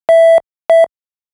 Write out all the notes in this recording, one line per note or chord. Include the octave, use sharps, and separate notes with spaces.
E5
E5